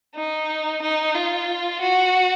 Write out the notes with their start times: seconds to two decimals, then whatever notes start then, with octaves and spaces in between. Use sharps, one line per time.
0.15 D#4
0.82 D#4
1.15 F4
1.81 F#4